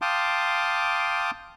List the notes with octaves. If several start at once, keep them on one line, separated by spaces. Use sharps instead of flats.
F5 G5 A5 C6 D6 D#6